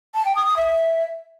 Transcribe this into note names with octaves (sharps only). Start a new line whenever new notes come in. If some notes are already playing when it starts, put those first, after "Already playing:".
A5
G5
D#6
D#6
E5